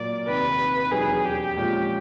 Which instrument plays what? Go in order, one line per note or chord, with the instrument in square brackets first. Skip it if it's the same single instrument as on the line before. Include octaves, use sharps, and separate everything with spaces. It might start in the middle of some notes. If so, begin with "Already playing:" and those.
Already playing: [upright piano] A#2 F#3 A#3 [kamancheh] D5
[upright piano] F1 D#2 D#3 [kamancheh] B4
[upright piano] E1 D#2 D#3 F#3 [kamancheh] G#4
[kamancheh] G4
[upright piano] A#2 F3 G#3 C#4